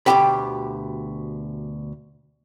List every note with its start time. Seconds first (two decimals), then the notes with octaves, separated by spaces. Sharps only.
0.06 D2 B2 G#3 G4 G5 B5